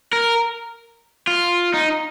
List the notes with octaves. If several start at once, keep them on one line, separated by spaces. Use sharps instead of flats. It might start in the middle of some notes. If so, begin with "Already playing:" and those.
A#4
F4
D#4